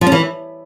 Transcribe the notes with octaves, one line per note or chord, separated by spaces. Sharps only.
F3
C#4
E3